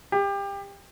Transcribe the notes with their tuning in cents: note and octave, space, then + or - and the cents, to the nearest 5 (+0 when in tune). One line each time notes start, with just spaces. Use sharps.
G4 +25